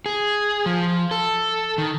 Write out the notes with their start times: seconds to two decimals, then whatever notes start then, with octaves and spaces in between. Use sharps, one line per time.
0.06 G#4
0.66 F3
1.11 A4
1.78 D#3